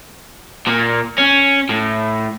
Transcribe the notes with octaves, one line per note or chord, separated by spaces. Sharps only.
A#2
C#4
A2